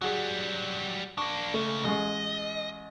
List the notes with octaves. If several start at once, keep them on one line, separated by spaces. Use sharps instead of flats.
F#3 G3 F#4 G#4
A#3 D4 C#6
C#2 C#3 A3
A1 G#3 D#5 C#6